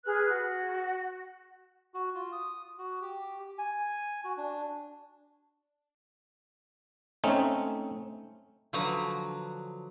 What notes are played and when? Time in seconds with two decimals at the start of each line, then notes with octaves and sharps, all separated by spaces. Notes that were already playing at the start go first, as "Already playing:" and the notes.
0.04 G#4 B4 F6 F#6
0.29 F#4
1.94 F#4
2.15 F4
2.32 D#6
2.78 F#4
3.02 G4
3.58 G#5
4.24 F#4
4.37 D4
7.24 A3 C4 C#4 D#4
8.73 D3 F3 F#3 B4 A#5